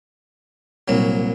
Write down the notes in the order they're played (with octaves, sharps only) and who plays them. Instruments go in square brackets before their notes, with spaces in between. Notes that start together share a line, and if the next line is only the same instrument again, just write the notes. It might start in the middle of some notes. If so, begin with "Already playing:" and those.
[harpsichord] C2 A#2 F#3